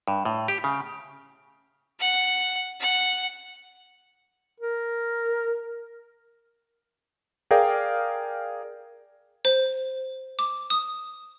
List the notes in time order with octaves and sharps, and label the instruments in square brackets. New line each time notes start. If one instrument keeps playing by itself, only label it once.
[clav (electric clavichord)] G2
A2
G4
C#3
[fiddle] F#5
F#5
[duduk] A#4
[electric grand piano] G#4 A#4 D5 F5 G5
[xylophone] C5
D6
D#6